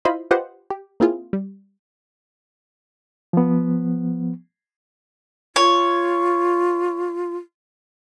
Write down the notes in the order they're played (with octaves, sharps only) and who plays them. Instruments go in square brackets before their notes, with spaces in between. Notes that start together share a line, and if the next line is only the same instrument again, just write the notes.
[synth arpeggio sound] E4 F4 C5 D#5 B5 C6
F4 G4 B4 C5 D#5 F#5
G4
A#3 C4 E4 F4 G#4
G3
[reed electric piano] F3 B3
[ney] F4 [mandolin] C#5